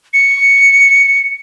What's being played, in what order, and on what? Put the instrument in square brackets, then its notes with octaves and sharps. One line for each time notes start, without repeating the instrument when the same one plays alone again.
[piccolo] C#7